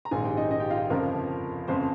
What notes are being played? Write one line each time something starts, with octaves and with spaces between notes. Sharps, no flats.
A#5
A#1 G#2 D#3 G#4 G#5
G4 G5
D#4 D#5
D#4 D#5
G4 G5
F4 F5
G1 F2 C#3 F3 A#4
G1 F2 C#3 C5